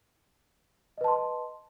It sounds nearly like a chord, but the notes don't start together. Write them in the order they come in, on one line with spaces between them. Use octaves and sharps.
D#5 B4 A5 C6